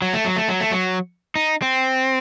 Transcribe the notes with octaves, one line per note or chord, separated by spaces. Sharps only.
F#3
A3
F#3
A3
F#3
A3
F#3
D#4
C4